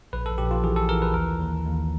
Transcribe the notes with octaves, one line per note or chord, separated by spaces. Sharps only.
A#1 B4
A4
A#1 G4
F4
E3 G#4
A4
E3 A#4
B4
D#2 A#4
D#2
D#2